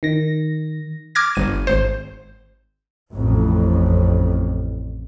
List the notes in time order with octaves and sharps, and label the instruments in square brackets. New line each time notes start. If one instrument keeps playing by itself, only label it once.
[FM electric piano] D#3 A#6
[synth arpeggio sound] D6 F6 G#6 A#6
G1 D#7
G#1 C5
[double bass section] A1 F2 A2